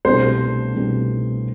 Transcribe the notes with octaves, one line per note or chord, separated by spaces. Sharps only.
C2 B2 A3 D4 G4 C5
C2 B2 A3 D4 G4